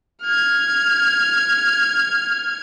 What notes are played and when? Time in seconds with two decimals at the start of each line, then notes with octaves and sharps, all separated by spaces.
0.22 F6 G#6